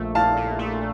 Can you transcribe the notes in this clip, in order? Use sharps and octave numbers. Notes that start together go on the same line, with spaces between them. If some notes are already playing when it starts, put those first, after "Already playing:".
Already playing: A#1 A#2 A3
A#2 F5 A5
A#2
A3